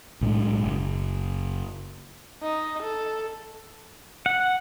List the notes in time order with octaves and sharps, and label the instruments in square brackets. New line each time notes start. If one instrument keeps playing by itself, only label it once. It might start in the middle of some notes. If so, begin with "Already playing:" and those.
[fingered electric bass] B1 A2 G#3 D4
F#1
[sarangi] D#4
A4
[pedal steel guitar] F#5